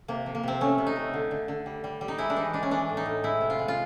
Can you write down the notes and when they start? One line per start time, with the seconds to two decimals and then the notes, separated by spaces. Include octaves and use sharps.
0.08 C3 A#3
0.26 F3
0.35 A#3
0.43 C3 C4
0.61 A3 C#4
0.78 C3
0.87 D#4
0.96 A3
1.14 D3
1.31 D3
1.48 D3
1.66 G3
1.84 G3
2.01 G3
2.08 D#4
2.18 G#3 E4
2.30 D4
2.36 E3 D#4
2.53 G#3 D4
2.63 C#4
2.71 E3 D4
2.89 A2
2.97 D#4
3.06 A2
3.23 G#3 E4
3.41 C3
3.50 F4
3.59 G#3
3.68 F4